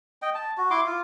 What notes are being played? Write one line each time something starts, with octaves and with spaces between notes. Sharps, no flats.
D#5 G5
A5
F#4
E4 C6 D6
F4